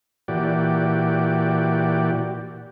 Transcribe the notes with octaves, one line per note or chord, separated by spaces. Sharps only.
A#2 E3 F#4 G4 D5